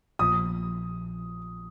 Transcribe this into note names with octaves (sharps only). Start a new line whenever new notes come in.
A#1 A#2 F3 D#6